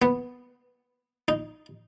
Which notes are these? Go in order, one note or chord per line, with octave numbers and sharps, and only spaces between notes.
B3
D#4